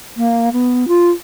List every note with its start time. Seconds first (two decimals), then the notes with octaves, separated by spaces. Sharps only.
0.17 A#3
0.53 B3
0.88 F4